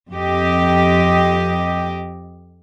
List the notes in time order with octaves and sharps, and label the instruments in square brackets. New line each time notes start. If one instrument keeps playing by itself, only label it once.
[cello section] F2 G4 D#5